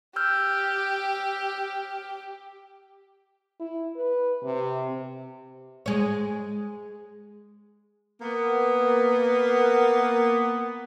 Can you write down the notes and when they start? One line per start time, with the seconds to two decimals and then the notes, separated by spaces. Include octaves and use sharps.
0.16 G4 E6 F6 G6
3.60 E4
3.96 B4
4.44 C3
5.86 G#3 C#5
8.22 A#3 B3